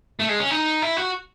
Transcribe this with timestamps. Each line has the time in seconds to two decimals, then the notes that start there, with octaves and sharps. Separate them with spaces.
0.20 A3
0.29 G#3
0.39 C#4
0.51 D#4
0.82 E4
0.97 F#4